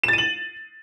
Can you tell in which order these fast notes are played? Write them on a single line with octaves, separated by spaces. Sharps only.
E7 A6 D#7 F#7